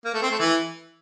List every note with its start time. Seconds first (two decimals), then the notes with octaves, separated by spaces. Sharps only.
0.05 A#3
0.13 A3
0.22 C4
0.31 A3
0.39 E3